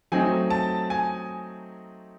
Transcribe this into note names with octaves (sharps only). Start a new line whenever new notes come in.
F#3 A3 C4 D#4 G#5
A5
G#5